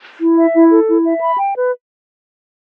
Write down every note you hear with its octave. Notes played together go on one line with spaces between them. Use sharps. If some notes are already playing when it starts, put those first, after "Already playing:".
E4
E5
E4
A4
E4
E5
B5
G5
B4